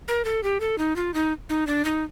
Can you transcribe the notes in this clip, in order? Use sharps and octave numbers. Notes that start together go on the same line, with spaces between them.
A#4
A4
G4
A4
D#4
F4
D#4
D#4
D4
D#4